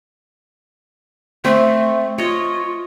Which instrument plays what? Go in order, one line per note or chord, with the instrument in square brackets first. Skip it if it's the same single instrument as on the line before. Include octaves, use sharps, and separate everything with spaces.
[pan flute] A3 [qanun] C4
[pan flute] F4 [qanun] C#5 D#5